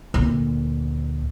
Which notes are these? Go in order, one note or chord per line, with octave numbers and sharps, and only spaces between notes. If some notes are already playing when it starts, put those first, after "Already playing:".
D2 A#2